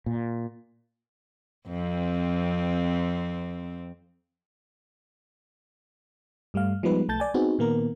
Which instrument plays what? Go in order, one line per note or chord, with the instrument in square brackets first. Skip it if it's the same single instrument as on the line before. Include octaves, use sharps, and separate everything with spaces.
[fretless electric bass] A#2
[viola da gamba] F2 C4
[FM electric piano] G2 G3 A3 F5
F3 G3 G#3 B3 D#4 B4
B1 A3 A5 G6 A6
D5 G#5
B3 C4 D#4 F#4 G#4
A#2 D#3 A#3 B3 A#4